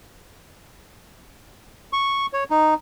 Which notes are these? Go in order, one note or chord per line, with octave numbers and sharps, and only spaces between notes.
C#6
C#5
D#4